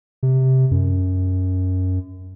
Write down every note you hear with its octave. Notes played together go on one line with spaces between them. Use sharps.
C3
F#2